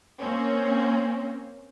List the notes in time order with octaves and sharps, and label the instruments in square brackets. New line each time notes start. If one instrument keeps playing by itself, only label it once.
[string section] A#3 C4 C#4